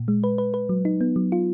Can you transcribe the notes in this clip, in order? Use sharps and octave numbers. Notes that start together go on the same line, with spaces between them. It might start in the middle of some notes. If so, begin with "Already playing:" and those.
Already playing: A#2
G#3
B4
B4
B4
F#3
D#4
B3
F#3
F4